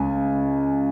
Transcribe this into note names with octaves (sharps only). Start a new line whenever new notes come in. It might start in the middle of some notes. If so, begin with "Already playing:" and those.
Already playing: C#2 C#3 G#5